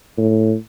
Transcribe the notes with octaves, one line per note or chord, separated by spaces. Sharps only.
A2